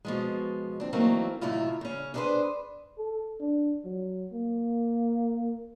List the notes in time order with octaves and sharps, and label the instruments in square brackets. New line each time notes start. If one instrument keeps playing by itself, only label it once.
[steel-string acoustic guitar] B2 F3 G#3
C4 D4
E3 F#3 A3 A#3 C4 D#4
F#2 A2 C3 D#3 E4 F4
C#3 C#4
D4 D#4 G#4 A4 B4 C5
[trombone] A4
D4
F#3
A#3